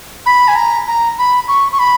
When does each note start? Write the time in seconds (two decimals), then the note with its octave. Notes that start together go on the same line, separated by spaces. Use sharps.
0.26 B5
0.48 G#5
0.56 A#5
0.87 A#5
1.18 B5
1.48 C#6
1.72 C#6
1.79 B5